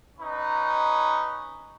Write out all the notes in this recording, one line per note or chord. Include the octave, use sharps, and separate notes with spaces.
C#4 D#4 B4